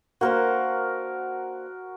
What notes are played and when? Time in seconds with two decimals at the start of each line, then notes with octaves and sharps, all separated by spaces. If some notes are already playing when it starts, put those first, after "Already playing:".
0.21 A#3 D4 F#4 A#4 C5 F#5